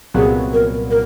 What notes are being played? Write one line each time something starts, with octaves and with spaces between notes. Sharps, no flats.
C2 A#2 F#3 B3 G#4
A#4
A#4